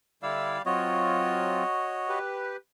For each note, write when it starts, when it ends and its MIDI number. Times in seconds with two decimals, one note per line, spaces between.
0.23 0.58 50
0.23 0.62 55
0.23 0.58 64
0.23 0.62 74
0.23 0.62 77
0.23 0.58 88
0.66 1.63 54
0.66 1.63 60
0.66 1.63 65
0.66 2.19 66
0.66 2.19 73
0.66 2.19 75
2.09 2.57 67
2.09 2.57 71